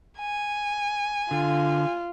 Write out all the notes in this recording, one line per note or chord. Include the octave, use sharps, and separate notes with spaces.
G#5
D3 F4